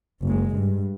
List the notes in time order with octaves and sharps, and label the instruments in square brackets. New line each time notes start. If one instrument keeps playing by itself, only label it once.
[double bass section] F#1 G#3
G2